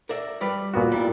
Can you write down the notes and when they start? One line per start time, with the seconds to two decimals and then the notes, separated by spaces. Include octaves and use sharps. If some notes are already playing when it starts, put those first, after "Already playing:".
0.09 A#4 D5 E5
0.41 G3 B4 D5
0.74 A#2 B3 F#4
0.92 G3 E4